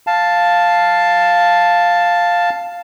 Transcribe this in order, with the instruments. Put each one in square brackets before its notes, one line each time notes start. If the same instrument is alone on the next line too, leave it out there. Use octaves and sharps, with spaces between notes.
[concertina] F5 A5